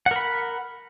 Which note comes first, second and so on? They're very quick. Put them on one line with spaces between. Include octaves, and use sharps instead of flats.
F#5 A#4 B5